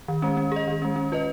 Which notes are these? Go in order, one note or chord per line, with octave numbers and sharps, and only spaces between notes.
D#3
G#3 C#4
C#4
G#4 D#5
D#3
G#3 C#4
C#4
F4 B4 D#5